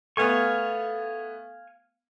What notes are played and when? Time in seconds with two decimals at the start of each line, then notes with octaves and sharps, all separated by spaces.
0.17 A3 B3 F5 G#5 C#6